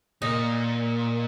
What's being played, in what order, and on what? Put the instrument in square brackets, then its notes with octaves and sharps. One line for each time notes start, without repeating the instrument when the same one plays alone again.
[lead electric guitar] A#2 [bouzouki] D#4